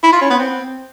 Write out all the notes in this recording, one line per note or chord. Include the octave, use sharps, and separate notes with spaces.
E4
F4
C#4
B3
C4